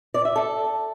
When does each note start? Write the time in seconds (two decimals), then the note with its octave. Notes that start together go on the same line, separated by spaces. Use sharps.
0.14 D5
0.25 E5
0.36 A4